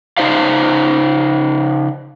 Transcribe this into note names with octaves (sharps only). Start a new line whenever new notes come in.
C#3 A#3 D#4 C5 D5 F5